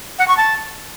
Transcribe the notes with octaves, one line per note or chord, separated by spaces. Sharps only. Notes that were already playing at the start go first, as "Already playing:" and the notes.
F#5
C#6
A5